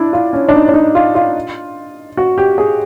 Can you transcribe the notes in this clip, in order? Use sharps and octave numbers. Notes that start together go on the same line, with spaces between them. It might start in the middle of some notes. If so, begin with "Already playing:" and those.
Already playing: D4 E4
F4
C#4
D4
D#4
D4
D#4
F4
F4
F#4
G4
G#4